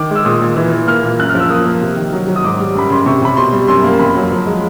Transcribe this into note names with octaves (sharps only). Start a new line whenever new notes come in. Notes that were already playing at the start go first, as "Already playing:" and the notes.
Already playing: D#3 D6
G#3 E6
A#2 D#6
A#2
E3
E3
A#3 F6
A#2
F#2 F#6
F6
F3 E6
A#3 D#6
A#3
C3
D#3
F#3
F#3
D#6
G#2 D6
G3
F#2 B5
C#3 C6
C3 C#6
C3 B5
B2 C6
G3
F#2 C6
A#3
F2 B5
F#3
F3
G#3